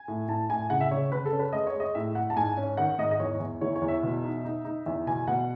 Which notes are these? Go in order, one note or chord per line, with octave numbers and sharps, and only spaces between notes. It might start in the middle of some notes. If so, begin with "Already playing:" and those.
Already playing: G#5
A2
A2 A5
A2 G#5
C#3 F#5
E5
C#3 C#5
C#3 B4
A4
C#4
B4
G#3 D#5
C#5
G#3
D#5
A2 E5
A2 F#5
A5
G#2 G#5
C#4
D#3 F#5
G#2 D#5
D#5
E2 C#5
E2
E3 C#5
C#5
E2
E5
B2
D#4
D#4
D#4
E2 E5
B2 G#5
B2 F#5